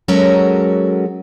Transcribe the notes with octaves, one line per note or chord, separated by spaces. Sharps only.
F#3 G#3 C#4 F#4 A4 A#4